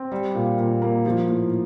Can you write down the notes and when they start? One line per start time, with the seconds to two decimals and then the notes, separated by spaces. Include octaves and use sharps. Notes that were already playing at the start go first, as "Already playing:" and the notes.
Already playing: C4
0.12 G3
0.35 A#2
0.58 A#2
0.82 A#3
1.06 F3
1.29 A2